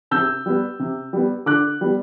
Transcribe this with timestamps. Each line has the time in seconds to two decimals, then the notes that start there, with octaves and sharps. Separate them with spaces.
0.11 C3 E6 G6
0.46 G3 B3
0.79 C3
1.13 G3 B3
1.46 D3 D6 F#6
1.81 G3 B3